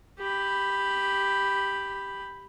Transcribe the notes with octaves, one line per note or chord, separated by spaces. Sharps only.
G4 B5